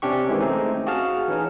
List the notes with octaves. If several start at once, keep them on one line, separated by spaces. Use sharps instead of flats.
C3 C#4 D4 G4 C#6
D#3 E3 G#3 C4
A3 C4 C#4 D#4
F#4 G#4 F5 A5 F6
E3 C#4 D#4